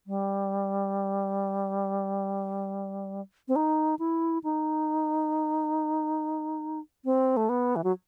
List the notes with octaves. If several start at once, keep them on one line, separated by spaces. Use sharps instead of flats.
G3
C4
D#4
E4
D#4
C4
A3
B3
E3
F#3